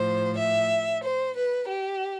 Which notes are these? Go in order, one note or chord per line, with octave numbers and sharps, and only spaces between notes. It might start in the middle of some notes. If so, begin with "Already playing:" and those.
Already playing: A2 F3 C5
E5
C5
B4
G4